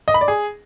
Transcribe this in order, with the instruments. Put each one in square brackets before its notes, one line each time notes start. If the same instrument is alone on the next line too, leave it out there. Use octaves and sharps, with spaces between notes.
[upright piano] D#5
B5
D5
G#4